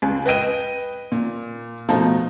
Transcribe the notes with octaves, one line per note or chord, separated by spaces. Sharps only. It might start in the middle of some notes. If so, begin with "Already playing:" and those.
C#2
B4 D#5 G5 D#7
A#2
B2 F3 A3 D#4 F4